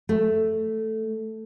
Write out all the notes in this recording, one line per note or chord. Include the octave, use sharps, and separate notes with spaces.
A3